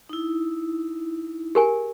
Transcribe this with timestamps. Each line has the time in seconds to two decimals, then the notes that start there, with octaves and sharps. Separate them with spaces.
0.09 D#4 E4
1.55 G4 G#4 A#4 G#5